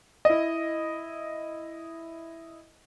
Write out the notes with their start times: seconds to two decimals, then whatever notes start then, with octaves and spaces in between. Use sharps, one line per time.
0.25 E4 D#5